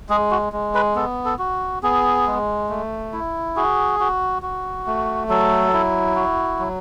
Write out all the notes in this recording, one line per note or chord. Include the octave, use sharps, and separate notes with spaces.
G#3 G#4
F#4
G#3
B4
B3 A4
A4
F#4
B3 G#4
G#3
A3
E4
F#4 G#4
F#4
F#4
A3
F#3 A4
E4
F#4
F#3